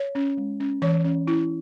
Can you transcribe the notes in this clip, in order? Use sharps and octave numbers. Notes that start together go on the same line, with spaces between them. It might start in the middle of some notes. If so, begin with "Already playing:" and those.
Already playing: C#5
C#4
G#3
C#4
E3 C#5
C#4
C#4 E4